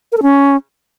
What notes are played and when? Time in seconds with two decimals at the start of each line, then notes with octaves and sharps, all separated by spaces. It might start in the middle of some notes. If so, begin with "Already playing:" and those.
0.12 A#4
0.17 A4
0.23 C#4